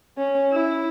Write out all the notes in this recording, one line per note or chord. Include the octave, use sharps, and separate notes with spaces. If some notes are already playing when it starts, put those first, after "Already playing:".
C#4
E4